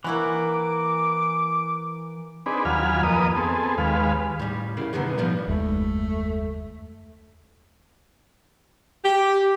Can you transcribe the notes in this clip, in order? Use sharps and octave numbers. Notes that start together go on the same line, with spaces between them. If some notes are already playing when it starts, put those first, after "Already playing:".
E3 A#3 E4 F#4 D6
C4 D4 D#4 G#4 B4
D#2 F#3 F4 G#5 B5 F6
F2 A#3 B4 D#5 D#6
B3 C4 G#4 A4
D#2 G#3 B4 F5
A2 G3
C#3 A#3 E4
F#2 B2 D3 D#3 B3
A2 F3 G3 B3 D#4
F#1 D#2 G#3 A3
G4